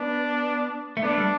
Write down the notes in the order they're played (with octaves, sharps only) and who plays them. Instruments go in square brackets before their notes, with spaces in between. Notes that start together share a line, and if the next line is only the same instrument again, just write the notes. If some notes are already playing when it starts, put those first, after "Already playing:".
Already playing: [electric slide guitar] B3 [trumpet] D4
[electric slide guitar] A3
[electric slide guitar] B3 [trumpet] D4
[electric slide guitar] A3
G3